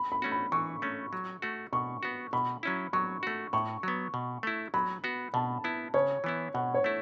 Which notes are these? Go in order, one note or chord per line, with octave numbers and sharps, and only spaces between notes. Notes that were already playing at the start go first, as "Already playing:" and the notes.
Already playing: B5
B5
A3 C#4 F#4
B5
E3 C#6
A3 C#4
F#3
A3 F#4
B2 C#6
B3 F#4
B2 B5
F#3 C#4 E4
F#3 C#6
A3 F#4
A2 C#6
F#3 B3
B2
A3 E4
F#3 B5
B3 F#4
B2 A5
B3 E4
C#3 C#5
E3 B3 E4
B2 F#5
C#5
A3 E4